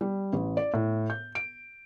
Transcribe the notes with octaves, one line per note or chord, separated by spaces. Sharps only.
G3
A1
D5
A2
G6
D7